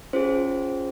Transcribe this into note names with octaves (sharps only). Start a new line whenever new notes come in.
C#4 F4 G#4 C5